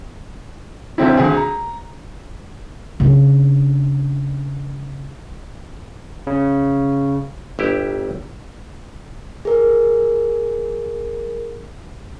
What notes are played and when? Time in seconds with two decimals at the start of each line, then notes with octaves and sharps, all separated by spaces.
0.98 B1 D3 C4 E4
1.17 D2 G#4
1.37 A#5
3.00 C#3 D4
6.27 C#3
7.59 G1 E4 G4
9.45 G#4 A#4